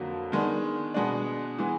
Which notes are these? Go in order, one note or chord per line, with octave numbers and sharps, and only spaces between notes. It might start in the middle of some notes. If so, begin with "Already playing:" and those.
Already playing: F2 D3 F#3 A#3
D#3 G#3 B3 D4
B2 G#3 B3 D4
E3 G#3 B3